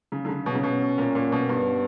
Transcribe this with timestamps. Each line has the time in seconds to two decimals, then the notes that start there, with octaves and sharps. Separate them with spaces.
0.12 C#3
0.25 D3
0.28 C#3
0.45 B2 C#4
0.55 C#3
0.63 B2
0.98 A#2
1.15 A#2
1.32 B2
1.49 G2 B3